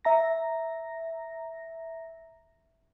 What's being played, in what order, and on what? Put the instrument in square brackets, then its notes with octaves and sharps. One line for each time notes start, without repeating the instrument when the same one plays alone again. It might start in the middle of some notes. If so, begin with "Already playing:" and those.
[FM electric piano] E5 A#5 A#6